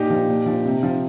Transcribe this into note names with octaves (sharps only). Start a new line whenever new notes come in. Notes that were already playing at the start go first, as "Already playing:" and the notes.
Already playing: A#2 D#4 G4
F3
A#2
F3
C3
F3